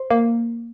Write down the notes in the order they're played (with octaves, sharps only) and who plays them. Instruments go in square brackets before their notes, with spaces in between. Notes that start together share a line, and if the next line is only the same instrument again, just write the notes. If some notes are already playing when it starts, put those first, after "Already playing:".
Already playing: [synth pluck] C5
A#3